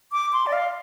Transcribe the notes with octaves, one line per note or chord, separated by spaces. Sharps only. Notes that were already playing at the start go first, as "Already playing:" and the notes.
D6
C6
D5
F5